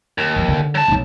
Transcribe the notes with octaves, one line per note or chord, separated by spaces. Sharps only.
D#2
D3 F3
D3
F#3 A5
B1 D#4